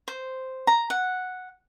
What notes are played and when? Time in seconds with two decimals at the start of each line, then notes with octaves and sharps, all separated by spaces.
0.08 C5
0.67 A#5
0.90 F#5